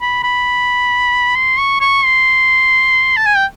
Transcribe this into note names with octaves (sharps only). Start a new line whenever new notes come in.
B5
B5
C6
C#6
C#6
C6
A5
G#5
G5